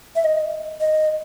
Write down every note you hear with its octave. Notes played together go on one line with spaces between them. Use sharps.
E5
D#5
D#5